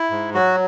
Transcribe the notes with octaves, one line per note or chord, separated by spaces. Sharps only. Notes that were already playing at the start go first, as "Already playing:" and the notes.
Already playing: E4
G#2
F#3 F#4